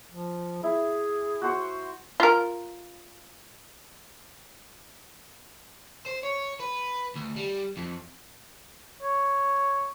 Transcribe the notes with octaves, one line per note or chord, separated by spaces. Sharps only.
F3
E4 G#4
F#4 C5 C#5
F4 A#4
C5
C#5
B4
D2
G3
F2
C#5